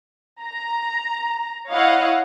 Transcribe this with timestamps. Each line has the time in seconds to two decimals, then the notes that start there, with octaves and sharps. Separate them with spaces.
0.42 A#5
1.70 E4 C#5 D#5 F5 F#5